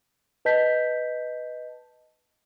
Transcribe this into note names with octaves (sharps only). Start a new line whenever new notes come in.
B4 D#5 A5 G6 B6